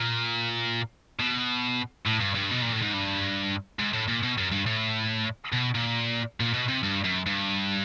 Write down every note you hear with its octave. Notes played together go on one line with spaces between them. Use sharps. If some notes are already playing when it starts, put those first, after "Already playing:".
Already playing: A#2
B2
A2
G2
G2
B2
A#2
A2
G#2
G2
G#2
A2
A#2
B2
F#2
G2
A2
B2
A#2
A#2
B2
C3
G2
F#2
G2